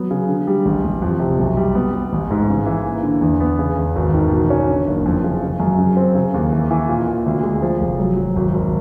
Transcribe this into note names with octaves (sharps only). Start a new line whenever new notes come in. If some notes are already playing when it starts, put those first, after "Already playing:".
Already playing: F#3 B3
C#3
D3
G3
A1
A1
F2
C3
B1
G3
B3
B3
A1
G#2
C#3
E3
A#3
D3
E2
B3
C#3
E2
G#1
D#3
B2
C#4
D3
F#1
F2
C#3
C#3
F#2
C#3
C4
C#3
D#2
E3
E3
A#2
A#2
D2
G#3
F3
F1
F#3
F#3
G#1
G#1